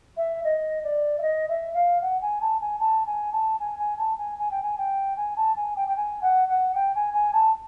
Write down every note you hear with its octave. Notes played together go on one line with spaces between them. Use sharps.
E5
D#5
D5
E5
D#5
E5
F5
F#5
G#5
A5
G#5
A5
G#5
A5
G#5
G#5
A5
G#5
G#5
G5
G#5
G5
G#5
A5
G#5
G5
G5
G#5
F#5
F#5
G5
G#5
G#5
A5